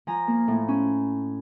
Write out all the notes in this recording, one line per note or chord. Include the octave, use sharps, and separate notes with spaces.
F3 G#5 A#5
A#3
A2
C#4